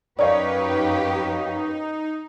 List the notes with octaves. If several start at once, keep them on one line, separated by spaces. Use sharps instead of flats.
F#2 D#4 G4 A#4 B4 C#5 D5 F5